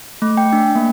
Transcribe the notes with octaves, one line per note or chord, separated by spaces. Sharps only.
A3
G5
D4
A#3